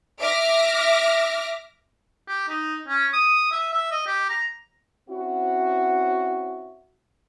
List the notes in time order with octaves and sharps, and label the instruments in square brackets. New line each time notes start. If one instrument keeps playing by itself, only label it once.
[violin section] E5 D6 F6 A#6
[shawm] G4
D#4
C#4
D#6
E5
E5
D#5
G4
A#5
[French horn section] C4 C#4 E4 F#4